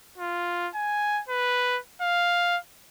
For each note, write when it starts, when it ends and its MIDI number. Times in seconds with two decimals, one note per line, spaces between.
0.18 0.69 65
0.75 1.22 80
1.29 1.79 71
2.01 2.58 77